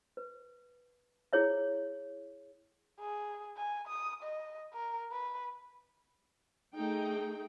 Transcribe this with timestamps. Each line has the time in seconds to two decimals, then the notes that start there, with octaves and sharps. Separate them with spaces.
0.17 B4
1.33 E4 G#4 C#5 E5
3.00 G#4
3.57 G#5
3.88 D#6
4.23 D#5
4.74 A#4
5.12 B4
6.74 A3 D#4 G#4 G5